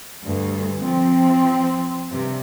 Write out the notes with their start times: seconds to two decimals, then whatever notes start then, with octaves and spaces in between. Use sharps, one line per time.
0.22 D2 G2
0.81 F3 C4
2.09 G2 C3